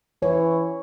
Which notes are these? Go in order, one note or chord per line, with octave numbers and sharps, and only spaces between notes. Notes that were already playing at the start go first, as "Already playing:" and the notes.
E3 C#5